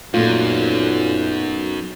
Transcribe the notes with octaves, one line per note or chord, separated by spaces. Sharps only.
B1 F#2 A#2 A3 F4